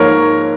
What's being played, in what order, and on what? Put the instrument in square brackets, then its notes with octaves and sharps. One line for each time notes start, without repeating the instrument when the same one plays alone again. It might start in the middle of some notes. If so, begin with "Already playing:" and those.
Already playing: [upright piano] G#2 F3 A#3 A#4 C#5